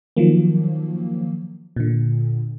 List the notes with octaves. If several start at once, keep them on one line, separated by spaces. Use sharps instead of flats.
D#3 F3 F#3 A#3
A#2 D3